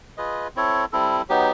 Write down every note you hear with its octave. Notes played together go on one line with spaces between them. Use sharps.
F4 G#4 B4 D#5
C4 E4 A4 C#5
G3 C4 E4 A4
F#3 B3 D#4 G4